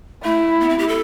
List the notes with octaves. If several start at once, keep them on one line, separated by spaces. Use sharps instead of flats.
A3 E4
B3
C4
G4
A4